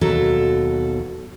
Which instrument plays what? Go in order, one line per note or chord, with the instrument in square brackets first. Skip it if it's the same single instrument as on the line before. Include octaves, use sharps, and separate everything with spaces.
[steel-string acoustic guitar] D#2 B2 F#3 A4